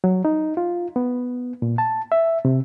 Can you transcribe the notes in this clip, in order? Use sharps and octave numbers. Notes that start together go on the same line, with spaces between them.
F#3
D#4
F4
B3
A#2
A5
E5
C3